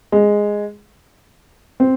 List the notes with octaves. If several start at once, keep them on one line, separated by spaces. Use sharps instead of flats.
G#3
C4